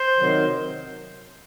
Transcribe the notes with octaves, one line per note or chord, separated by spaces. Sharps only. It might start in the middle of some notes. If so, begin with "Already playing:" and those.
Already playing: C5
C3 D#3 F#3